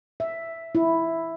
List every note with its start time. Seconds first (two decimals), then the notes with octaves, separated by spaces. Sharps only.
0.20 E5
0.75 E4